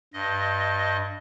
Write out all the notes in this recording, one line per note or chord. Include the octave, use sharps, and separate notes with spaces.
G2 D#5